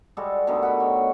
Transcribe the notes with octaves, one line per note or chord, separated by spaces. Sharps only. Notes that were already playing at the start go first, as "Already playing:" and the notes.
G3 G#3 F#4 A4
B2 D3 D#3 A3
F#5 B5
C#5